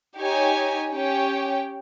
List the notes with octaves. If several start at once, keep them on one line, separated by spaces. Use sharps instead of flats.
D#4 G4 C#5 G#5
C#4 G4 C#5 G5